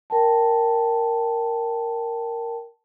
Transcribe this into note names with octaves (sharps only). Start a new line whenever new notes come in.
A#4 G5 A5